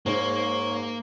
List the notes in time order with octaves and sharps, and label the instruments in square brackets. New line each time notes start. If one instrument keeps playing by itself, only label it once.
[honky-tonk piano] G#2 [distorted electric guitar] A#3 [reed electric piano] C5 [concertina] C#5